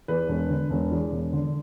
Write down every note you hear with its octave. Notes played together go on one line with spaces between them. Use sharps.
E2 B4
E1
D3
E1
E2
E1
D3